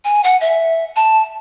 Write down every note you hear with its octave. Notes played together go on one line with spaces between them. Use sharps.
G#5
F#5
E5
A5